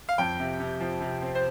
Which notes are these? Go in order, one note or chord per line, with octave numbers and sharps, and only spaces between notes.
F5
F2 G5
C3
C3
F3
C3
C4
C5